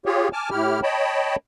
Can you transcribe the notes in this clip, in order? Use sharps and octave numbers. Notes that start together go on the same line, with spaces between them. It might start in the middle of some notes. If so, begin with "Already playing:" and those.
F4 G4 G#4 C#5
G#5 A5 D6 F6
A2 E4 G4 F6
C#5 D#5 G5 A5 B5